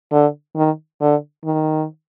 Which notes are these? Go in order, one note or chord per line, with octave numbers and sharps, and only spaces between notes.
D3
D#3
D3
D#3